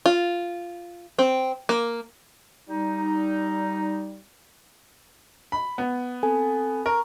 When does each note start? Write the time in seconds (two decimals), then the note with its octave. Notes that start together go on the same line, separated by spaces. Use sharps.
0.06 F4
1.19 C4
1.69 A#3
2.68 G3 D#4
5.52 B5
5.78 B3
6.23 C4 A4 G#5
6.86 A#4 C#6